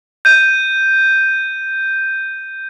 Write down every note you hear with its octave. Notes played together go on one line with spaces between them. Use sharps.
G6 D#7